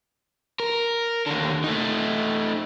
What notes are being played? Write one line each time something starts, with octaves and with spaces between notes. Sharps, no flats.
A#4
D#2 D3
A3 D#4